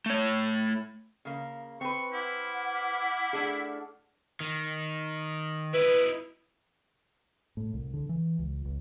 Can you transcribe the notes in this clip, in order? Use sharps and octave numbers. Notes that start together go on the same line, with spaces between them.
A3 C#5
C#3 A#3
C4 B4 C#6
E4 F#5 D6 F6
A3 D4 G#4
D#3
E4 B4 D#5
A2
C2
D3
E3
C#2
C#2